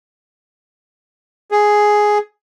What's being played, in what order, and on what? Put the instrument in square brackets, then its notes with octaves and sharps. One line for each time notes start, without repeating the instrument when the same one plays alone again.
[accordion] G#4